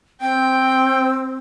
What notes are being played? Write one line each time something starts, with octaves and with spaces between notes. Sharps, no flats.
C4 G5